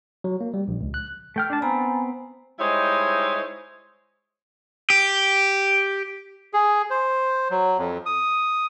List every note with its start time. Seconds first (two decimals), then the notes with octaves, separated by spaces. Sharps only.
0.24 F#3
0.41 A#3
0.54 G3
0.68 A#1
0.81 C#2
0.94 F#6
1.36 A3 G5 F6
1.50 D4 A5
1.62 B3 C4 G#5 A#5 B5
2.59 G3 G#3 D#4 E4 C5 C#5
4.90 G4
6.54 G#4
6.90 C5
7.50 F#3
7.78 F2
8.06 D#6